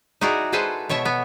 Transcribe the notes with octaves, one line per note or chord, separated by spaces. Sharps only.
D#4 E4 F#4 G#4 D5
G#3 G#4 A4 B4 C5 A5
B2 C#5 E5 A5
B3